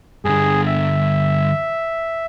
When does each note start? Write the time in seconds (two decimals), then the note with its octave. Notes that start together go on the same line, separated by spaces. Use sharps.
0.25 G2 D3 G#4
0.66 E5